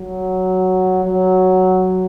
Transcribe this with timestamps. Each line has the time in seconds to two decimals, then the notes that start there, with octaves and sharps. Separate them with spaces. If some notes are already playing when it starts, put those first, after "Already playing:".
Already playing: F#3
1.05 F#3